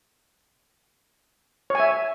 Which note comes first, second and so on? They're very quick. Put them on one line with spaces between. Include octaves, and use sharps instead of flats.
C#5 G#5 E5